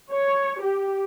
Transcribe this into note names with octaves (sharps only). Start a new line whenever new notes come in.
C#5
G4